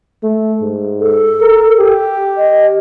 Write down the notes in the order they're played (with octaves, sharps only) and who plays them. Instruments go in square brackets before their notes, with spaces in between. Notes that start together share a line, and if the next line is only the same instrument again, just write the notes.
[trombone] A3
G#2
[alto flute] A4
[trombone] A#4
G4
[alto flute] D#5